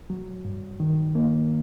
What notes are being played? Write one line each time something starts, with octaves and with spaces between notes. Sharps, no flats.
F#3
G2
D#3
A#3